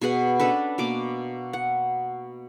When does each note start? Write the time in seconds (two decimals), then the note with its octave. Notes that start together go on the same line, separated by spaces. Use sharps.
0.01 B2 G#4 B4 F#5
0.39 C#4 D4 A4 B4
0.78 B2 A#3 D6
1.53 F#5